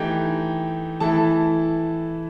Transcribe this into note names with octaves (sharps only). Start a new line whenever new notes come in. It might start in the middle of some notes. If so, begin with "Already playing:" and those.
Already playing: E3 A3 D#4 G4 G5
E3 A3 E4 A4 A5